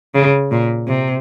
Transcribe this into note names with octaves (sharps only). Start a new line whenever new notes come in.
C#3
A#2
C3